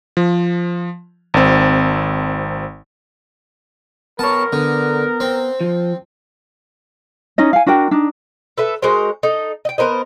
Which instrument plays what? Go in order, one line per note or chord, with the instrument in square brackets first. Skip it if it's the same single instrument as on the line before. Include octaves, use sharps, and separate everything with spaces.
[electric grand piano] F3
G#1 C4
[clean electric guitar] B3 C#5 [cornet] A#4 [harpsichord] A5
[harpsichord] D3 [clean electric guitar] B3
[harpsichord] C4
[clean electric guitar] F3
[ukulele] C#4 D#4 D#5
F5 G#5
D4 F#4 A#4 G5
D4 D#4
[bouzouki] A4 B4 E5
G#3 F#4 A#4 C5
D#4 A4
D#5 G5
B3 A#4 C5 D#5